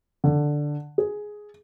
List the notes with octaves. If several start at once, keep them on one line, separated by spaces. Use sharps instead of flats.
D3
G#4